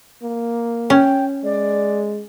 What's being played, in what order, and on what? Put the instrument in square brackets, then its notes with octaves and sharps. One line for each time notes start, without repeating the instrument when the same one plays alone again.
[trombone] A#3
[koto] C#4 [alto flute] G5
[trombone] G#3 [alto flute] D5